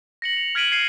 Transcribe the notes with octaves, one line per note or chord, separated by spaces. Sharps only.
A#6 C#7 F#7
F7
F6 G#6 B6 D7 D#7 F#7
F6 G#6 C7 C#7 D#7